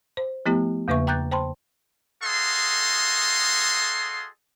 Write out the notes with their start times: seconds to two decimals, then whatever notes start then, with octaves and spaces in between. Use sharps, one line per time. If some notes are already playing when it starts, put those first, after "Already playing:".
0.17 C5
0.46 F3 A3 B3 E4 G4
0.88 E2 C#3 A#3 B4 E5 C#6
1.07 G5 A#5 D6 F#6 G6 A6
1.31 C5 G5 A5 B5 C6
2.23 F#4 G#4 A4 D#5 F5 C6